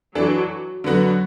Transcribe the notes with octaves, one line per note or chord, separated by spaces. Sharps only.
E3 F#3 D4 A4
D3 F#3 B3 F#4